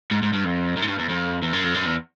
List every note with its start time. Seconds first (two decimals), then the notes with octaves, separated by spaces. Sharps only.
0.11 G#2
0.23 G#2
0.33 G2
0.45 F2
0.77 F#2
0.82 G#2
0.88 G2
0.99 E2
1.09 F2
1.42 E2
1.53 F#2
1.64 F2
1.74 F#2
1.85 E2